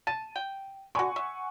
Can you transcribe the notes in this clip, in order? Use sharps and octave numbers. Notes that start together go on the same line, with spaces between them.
A5 D#7
G5
D3 F#4 F#5 G#5 C#6
E5